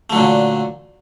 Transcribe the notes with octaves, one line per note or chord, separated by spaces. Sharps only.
A#2 D3 F#3 A3